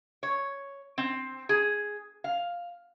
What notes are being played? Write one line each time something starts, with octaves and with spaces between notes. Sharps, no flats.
C#5
C4
G#4
F5